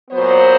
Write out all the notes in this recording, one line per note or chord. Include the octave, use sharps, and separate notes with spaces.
A#2 F#3 B3 C5